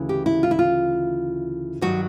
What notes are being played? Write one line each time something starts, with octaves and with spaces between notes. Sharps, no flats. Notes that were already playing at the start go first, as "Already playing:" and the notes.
Already playing: D2 C#3 E3
G4
E4
F4
E4
F4
G2 D#3 F#3 F#4